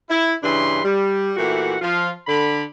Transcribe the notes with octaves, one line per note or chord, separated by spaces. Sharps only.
E4
G2 C#3 E3 D4 B5 C6
G3
A#2 E3 A3 F#4 G4 F#5
F3 F4
D3 B5